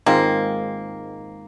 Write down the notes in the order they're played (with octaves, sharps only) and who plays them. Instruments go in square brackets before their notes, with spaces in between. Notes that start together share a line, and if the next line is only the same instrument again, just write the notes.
[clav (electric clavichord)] G#2 D#3 G#3 C4 F4 [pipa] A#3